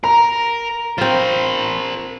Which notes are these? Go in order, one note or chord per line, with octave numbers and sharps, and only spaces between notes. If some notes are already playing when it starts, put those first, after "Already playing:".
A#4 A#5
C4 F4 A#4 C5